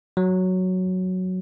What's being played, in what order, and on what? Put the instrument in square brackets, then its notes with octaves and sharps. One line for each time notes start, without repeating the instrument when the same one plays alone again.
[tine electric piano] F#3